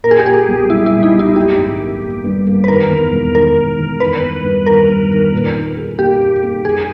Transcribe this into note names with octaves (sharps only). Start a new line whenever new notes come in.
A#2 A#4
G#4
G4
A#2 G#4
B1
G3 E4
E4
A#2
D#4
B1
E4
A#3 G4
G#1
A#3
A#3
G2
A#3
B4
D#3 A#4
E2
E1
D#3 A#4
E1
E2
D#3 B4
G1
G2
D#3 A#4
G2
D#3
A#2
D#4
G#4
A#3 G4
D#4
A#3
A#3 G#4